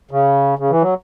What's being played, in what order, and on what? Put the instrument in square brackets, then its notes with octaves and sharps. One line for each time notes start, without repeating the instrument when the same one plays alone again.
[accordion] C#3
C#3
E3
F#3